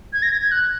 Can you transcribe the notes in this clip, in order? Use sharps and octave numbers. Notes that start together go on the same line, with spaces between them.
G#6
A#6
G#6
G#6
F#6